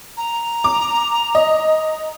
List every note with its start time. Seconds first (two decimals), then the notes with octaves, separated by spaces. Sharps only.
0.17 A#5
0.64 D6
1.35 D#5